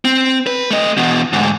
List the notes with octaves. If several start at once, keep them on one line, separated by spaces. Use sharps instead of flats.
C4
B4
A3 D#5
E2 B2
D2 G#2